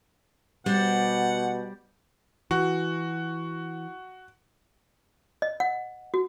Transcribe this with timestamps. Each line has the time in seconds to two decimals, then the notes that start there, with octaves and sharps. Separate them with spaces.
0.66 B2 G3 C5 D5 F#5
2.51 E3 F#4
5.42 D#5
5.60 F#5
6.14 F#4